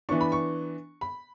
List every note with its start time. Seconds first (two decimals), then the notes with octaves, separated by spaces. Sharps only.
0.09 E3 B3 D4 C#6
0.21 B5
0.32 C#6
1.01 B5